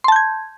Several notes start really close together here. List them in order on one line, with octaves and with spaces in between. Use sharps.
C6 A5 G6 G#6